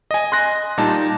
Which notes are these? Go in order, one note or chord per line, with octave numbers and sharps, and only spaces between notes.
D#5 G#5
C6 F#6 A#6
A#2 G3 D#4 A5